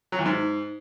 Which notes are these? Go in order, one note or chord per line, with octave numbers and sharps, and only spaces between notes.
F#3
E2
G#2